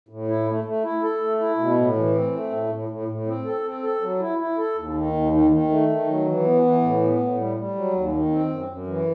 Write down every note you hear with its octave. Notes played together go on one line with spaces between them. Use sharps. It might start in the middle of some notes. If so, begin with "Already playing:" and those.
A2
E4
A3
A3
E4
A4
A3
E4
B2
A2
E3
C4
A3
A2
A2
A2
A2
C4
A4
C4
A4
F#3
E4
E4
A4
D#2
D#3
D#2
D#3
D#3
A3
D#3
F#3
E3
B3
E3
A2
B3
A2
G3
G3
F#3
D#2
D#3
C4
F#2
F#2
E3